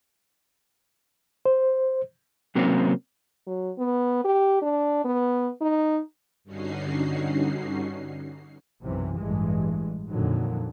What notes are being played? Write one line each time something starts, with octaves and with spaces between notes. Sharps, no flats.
C5
C3 F#3 A#3 C4 C#4
F#3
B3
G4
D4
B3
D#4
G2 D3 C#4 D#4 F#4 C7
B1 F#2 C3 E3
A1 G2 E3 G#3
F2 A#2 D3 D#3 F#3